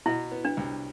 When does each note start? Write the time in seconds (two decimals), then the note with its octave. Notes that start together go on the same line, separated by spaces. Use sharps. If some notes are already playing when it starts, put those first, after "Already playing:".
0.06 B2 E4
0.31 B3
0.45 D4
0.57 C2